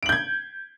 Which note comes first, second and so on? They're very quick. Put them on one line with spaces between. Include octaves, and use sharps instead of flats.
D7 F#7 G6 G#6